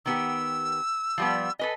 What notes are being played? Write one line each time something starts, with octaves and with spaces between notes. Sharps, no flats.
D#3 B3 G4 E6
F3 G3 B3
A4 B4 D#5 G#5